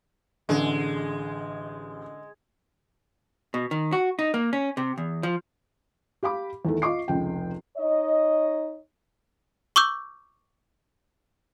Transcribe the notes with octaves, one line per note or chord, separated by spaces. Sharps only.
A1 D3 G#3
B2
D#3
F#4
D#4
A#3
C#4
C3
E2
F3
G4 F5 B5 D6
E2 D#3 A3
F4 D#5 C#6 D6 C7
F1 C#2 G5
D#4 C#5 D#5
C#6 D6 E6 G6